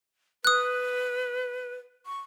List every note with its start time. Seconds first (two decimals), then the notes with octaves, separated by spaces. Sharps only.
0.45 B4 D#6 F#6
2.06 C#6